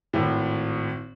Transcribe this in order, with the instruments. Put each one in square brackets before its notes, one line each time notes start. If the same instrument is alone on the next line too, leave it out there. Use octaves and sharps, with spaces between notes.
[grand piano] G#1 A2